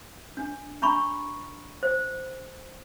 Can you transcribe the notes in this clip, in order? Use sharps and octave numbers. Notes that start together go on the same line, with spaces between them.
D4
D4 A#5 B5 C#6
C5